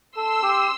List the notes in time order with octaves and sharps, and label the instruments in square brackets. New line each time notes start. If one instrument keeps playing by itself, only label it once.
[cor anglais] A4 [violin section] C6 E6
[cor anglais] G4